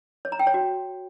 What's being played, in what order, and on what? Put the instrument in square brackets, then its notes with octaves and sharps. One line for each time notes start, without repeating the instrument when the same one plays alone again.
[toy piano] C#5
A#5
G5
C#5
F#4